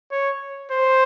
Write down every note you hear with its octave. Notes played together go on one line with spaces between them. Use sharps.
C#5
C5